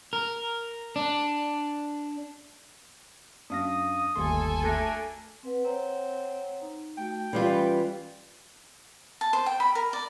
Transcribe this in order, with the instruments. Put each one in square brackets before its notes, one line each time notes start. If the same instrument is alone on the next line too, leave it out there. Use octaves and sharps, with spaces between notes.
[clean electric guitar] A#4
D4
[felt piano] F#2 [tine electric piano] D4 F5 A#6 [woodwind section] D#6
[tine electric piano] G1 D#2 C6 [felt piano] G3 A3 [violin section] A4 G#5
[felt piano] A3 E5 [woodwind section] D4 F#4 A#4
[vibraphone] C4 B4 F#5
[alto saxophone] C4 [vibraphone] C#5 F#5 A#5
[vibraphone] D#4
[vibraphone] A3 F#4 [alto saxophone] G5
[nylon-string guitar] E3 G3 F4 [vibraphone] C#4
[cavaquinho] A5
C5
G5
B5
A#4
D5